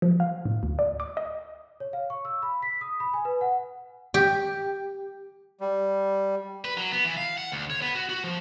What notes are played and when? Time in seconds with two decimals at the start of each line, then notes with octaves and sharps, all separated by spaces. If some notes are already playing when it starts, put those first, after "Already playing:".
0.02 F3
0.20 F5
0.45 A2
0.63 D2
0.79 D5
1.00 D6
1.17 D#5
1.80 C#5
1.93 F5
2.10 C#6
2.25 E6
2.43 B5
2.62 B6
2.81 D#6
3.00 B5
3.14 G#5
3.25 B4
3.41 F#5
4.14 G4
5.61 G3
6.65 B4
6.78 F#3
6.92 B3
7.04 E3
7.17 F5
7.38 F#5
7.52 D2
7.70 C#5
7.82 B3
7.95 F#4
8.10 F#4
8.24 F3